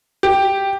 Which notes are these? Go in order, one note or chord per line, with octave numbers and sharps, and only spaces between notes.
G4